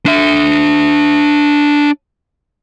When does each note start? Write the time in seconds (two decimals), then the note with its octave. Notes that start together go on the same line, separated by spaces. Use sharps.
0.06 D4 E5